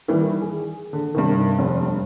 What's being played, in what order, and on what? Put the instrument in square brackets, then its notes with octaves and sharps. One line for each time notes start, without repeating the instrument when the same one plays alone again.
[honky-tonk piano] D#3 E3 G3
G#4
D3
G2 C3 D#3
F1
G2